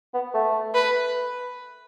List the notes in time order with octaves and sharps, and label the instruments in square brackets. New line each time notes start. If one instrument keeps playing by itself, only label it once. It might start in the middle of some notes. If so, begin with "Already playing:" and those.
[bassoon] B3
A3
[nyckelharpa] B4